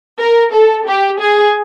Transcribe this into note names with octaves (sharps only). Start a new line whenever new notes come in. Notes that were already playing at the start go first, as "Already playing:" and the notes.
A#4
A4
G4
G#4